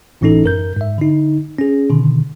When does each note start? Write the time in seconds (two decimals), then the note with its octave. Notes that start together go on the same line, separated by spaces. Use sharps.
0.21 G1 A2 E3 C#4 D#4 A4
0.44 F#2 A#4 G6
0.76 G#2 E5
0.98 D3 D#4
1.59 C#4 G#4
1.90 B2 D3 D#3